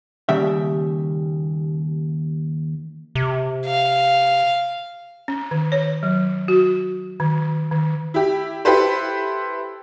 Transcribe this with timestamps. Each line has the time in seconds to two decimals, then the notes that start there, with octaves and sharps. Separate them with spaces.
0.29 D#2 C#3 G3 E5
3.15 C3
3.66 F5
5.28 C#4
5.51 D#3
5.72 C#5
6.03 F#3
6.48 F#4
7.20 D#3
7.71 D#3
8.14 E4 G4
8.65 E4 G4 A4 B4 C5